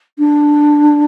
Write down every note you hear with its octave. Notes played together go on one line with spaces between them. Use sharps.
D4